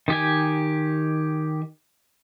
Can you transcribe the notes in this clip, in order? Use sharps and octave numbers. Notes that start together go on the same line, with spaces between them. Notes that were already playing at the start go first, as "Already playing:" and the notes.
D#3 G4 G#5